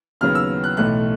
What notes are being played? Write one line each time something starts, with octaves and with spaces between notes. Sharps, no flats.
D#2 C#3 F#3 B3 F6
E6
F#6
B1 A2 E3 A3 F#6